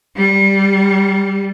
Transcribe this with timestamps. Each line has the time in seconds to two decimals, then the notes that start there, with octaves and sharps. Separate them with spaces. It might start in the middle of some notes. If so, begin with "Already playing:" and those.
0.16 G3